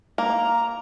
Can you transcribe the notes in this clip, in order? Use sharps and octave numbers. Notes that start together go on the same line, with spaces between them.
A#3 A#5